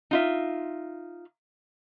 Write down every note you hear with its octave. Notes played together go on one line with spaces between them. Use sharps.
D#4 F4 E5